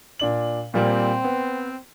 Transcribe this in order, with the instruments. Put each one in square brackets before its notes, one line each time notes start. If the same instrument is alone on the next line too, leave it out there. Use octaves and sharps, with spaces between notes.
[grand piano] A#2 D4 F#7
[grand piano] A#2 G3 A#3 [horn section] C4
[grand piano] B3